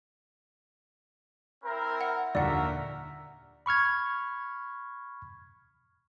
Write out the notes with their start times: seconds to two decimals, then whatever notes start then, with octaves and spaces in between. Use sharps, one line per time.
1.64 C4 E4 A#4
2.01 F#5
2.35 D#2 A#2 D3 F#4 A#4 D5 E5 F#5
3.66 B5 C#6 F6 G#6